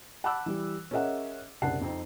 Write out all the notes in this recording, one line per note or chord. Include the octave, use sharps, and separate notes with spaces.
F#5 A5 B5 D6 E6 F#6
E3 G3
C#4 G#4 A#4 D#5 E5 F#5
F#1 C2 D4 F#5 A5 C7
F2 C4 D#4